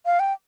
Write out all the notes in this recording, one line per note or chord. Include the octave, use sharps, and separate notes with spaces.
F5
G5